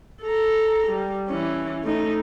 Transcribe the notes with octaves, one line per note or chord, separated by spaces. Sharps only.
A4 A#5
G3
E3 C#4
A3 D#4